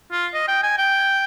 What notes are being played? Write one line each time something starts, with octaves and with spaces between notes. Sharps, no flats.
F4
D#5
G5
G#5
G5